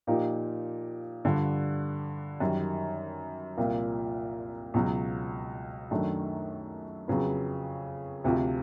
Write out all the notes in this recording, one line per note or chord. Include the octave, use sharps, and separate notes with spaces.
A#2 F3 A#3 D#4 G4
G2 D3 F3
F#2 D#3 G3
C2 A#2 F3 A#3
C#2 B2 F#3
F#2 D#3 F#3 A3 D4
F2 C#3 F#3 B3
D2 C3 F3